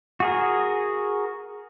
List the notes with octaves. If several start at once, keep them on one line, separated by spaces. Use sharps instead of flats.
F#4 G#4 A#4